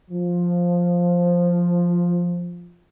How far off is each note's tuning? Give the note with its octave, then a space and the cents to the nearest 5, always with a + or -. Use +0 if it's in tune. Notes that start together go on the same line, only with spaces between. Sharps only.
F3 +5